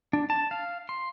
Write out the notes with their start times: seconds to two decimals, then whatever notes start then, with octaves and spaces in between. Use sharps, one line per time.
0.13 D4
0.30 A5
0.51 F5
0.89 C6